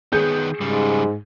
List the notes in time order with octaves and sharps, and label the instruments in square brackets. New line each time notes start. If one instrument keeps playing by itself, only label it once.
[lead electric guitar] D#3 B3 [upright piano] G#4 G6
[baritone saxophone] G#2 [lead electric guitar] C#3 G3